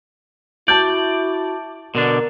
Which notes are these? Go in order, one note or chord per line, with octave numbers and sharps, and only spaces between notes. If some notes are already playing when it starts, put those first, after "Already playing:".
E4 F#4 D5 A5 G6
B2 D3 D4 A#4 D5